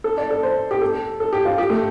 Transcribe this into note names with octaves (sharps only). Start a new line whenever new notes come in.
A4
D5
A4
C5
G4
A4
A4
G4
F4
G4
A3